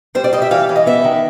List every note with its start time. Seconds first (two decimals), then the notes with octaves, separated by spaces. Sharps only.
0.15 G3 C5
0.24 D5
0.33 G3 D#5
0.42 E5
0.51 E3 F5
0.69 E3
0.76 D#5
0.86 B3 E5
1.04 D#3